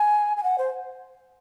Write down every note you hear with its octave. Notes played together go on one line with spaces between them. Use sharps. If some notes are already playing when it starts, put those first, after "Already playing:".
Already playing: G#5
G#5
F#5
C5